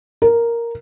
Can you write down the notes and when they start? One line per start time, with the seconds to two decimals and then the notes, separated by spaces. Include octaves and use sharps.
0.22 A#4